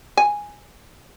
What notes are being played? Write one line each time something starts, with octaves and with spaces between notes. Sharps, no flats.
G#5